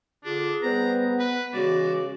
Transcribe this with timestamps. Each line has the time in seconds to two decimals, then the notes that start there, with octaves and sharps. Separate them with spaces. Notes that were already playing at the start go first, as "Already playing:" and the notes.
0.24 D3 D4 F4 G4 G#4
0.62 G3 B3 B4 C5 A#5
1.20 B4
1.54 C#3 E3 G#3 F#4 D5